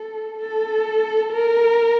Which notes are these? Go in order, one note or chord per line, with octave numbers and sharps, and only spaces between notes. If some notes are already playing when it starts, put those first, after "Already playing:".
Already playing: A4
A4
A#4